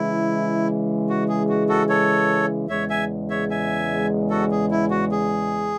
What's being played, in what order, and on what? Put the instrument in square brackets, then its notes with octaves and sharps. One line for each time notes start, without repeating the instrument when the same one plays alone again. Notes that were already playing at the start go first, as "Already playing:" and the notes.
Already playing: [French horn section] C#3 E3 G#3 [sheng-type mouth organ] E4
[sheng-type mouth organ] F#4
G#4
F#4
F#4 A4
A4 C#5
[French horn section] E2 C#3 G#3 [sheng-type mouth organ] C#5 E5
[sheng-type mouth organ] E5 G#5
C#5 E5
E5 G#5
F#4 A4
G#4
E4
F#4
G#4